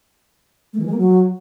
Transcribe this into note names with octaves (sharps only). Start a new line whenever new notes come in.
A3
E3
G#3
A#3
F#3